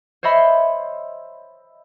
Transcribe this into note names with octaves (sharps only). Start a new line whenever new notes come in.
C5 C#5 D#5 E5 B5 C6